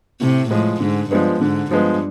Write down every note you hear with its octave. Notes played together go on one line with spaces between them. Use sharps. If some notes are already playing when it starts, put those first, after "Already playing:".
A2 C3
A2 F3 G#3
G#2 D3
G2 F3 G#3 B3
G#2 D3
G2 F3 G#3 B3